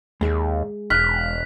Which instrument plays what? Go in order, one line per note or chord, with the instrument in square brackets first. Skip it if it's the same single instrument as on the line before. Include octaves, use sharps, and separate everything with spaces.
[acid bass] D#2 [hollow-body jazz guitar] G#3 G#4 E5
[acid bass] E1 [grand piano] F6 F#6 [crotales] B6